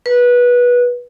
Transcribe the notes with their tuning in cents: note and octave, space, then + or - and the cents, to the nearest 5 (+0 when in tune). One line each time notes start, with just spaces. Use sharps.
B4 -20